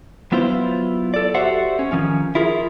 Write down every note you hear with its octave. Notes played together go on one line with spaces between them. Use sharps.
F#3 B3 E4 F4 C5
A4 D5
F#4 G4 A4 C5 E5 F#5
C#4
D#3 F3 C#4
E4 F4 G#4 A#4